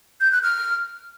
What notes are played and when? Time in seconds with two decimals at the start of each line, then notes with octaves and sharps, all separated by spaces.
0.21 G6
0.32 F#6
0.43 F6